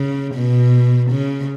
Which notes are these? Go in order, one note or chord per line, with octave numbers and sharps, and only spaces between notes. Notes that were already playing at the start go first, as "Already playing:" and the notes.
Already playing: C#3
B2
C#3